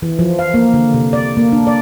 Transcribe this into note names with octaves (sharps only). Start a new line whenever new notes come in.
E3
F3
F5
A#3
D3
C3
D5
A#3
D4
D5